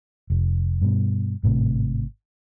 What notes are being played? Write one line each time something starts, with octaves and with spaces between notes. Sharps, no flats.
F1
G2 B2
G#1 A2 C3